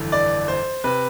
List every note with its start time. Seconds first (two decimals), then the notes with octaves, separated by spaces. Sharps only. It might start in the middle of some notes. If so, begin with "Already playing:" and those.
Already playing: G1 F2 E3
0.12 D5
0.48 C5
0.84 C3 B4